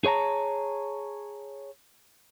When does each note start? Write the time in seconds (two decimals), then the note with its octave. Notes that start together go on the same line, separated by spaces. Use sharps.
0.05 G#4 C#5 A5 A#5